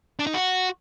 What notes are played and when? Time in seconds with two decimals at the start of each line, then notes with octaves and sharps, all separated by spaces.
0.19 D4
0.27 D#4
0.34 F#4